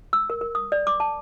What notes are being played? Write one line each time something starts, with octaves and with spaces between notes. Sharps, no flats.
E6
A#4
A#4
D#6
D5
D6
A5